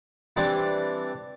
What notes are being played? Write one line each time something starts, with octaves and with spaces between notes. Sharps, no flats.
E3 G3 C4 D4 E4